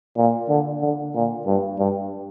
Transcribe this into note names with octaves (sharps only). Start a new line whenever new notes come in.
A#2
D3
D3
A#2
G2
G2